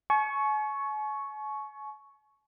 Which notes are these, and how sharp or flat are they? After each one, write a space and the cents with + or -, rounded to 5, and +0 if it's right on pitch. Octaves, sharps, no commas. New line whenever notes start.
G#5 +45 C#6 +0